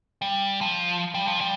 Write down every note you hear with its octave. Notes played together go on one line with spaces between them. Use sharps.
G3
F3
G3
F3
G3